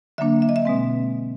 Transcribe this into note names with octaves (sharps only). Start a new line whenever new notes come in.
D3 F#3 A#3 D4 E5
E5
D#5
E5
B2 G#3 C4